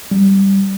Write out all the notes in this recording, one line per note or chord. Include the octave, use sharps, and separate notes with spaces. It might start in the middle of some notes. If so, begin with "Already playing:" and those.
G3